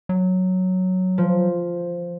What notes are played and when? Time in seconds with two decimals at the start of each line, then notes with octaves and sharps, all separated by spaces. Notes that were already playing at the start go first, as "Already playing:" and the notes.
0.09 F#3
1.18 F3